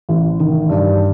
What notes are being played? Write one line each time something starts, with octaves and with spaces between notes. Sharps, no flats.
A1
D#3
G2